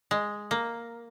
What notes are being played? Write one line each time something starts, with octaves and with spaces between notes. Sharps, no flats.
G#3
A#3